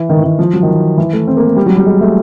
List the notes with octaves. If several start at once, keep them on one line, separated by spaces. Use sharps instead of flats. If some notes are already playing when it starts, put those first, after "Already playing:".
Already playing: E3
D#3
E3
D#3
F3
F#3
D#3
E3
E3
A3
C4
A#3
A3
G3
F#3
G3
G#3
A3